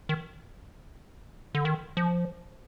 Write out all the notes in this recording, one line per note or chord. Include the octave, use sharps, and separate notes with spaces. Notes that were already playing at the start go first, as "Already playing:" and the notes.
D#3
D3
D#3
F3